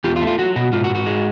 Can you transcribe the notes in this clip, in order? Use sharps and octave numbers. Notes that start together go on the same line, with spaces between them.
E2 F4 G4
F4
A3
F4
F#3 F#4
B2 F#4
G#2 F4
F#4
G#2
F#4
G#3